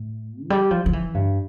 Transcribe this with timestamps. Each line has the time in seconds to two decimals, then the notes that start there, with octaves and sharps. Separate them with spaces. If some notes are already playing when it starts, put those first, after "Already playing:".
Already playing: A2
0.45 F3
0.50 G3
0.71 F3
0.86 F3
0.93 E3
1.14 G2